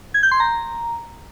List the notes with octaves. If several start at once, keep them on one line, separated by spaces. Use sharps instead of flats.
G#6
G6
C6
A#5